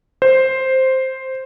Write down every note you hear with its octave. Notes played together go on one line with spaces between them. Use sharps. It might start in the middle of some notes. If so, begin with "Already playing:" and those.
C5